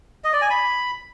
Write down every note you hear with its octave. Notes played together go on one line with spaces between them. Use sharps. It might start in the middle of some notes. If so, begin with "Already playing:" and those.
D#5
D5
G#5
B5